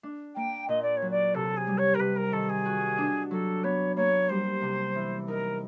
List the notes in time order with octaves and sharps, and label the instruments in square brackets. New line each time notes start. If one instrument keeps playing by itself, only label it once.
[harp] D4
[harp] A#3 [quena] G5
[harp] A#2 [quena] D#5
[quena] D5
C#5
[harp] F#3
[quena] D5
[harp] C3 [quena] A4
[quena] G#4
[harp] G3
[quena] C#5
A#4
[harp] C3 [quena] B4
[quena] A#4
[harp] D#3 [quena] A4
[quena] G#4
[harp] F#4
D4
[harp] F#3 [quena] A4
[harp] B3 [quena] C#5
[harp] A#3 [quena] C#5
[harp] G3 [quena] C5
[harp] C3
E3
[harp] D#4 [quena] A#4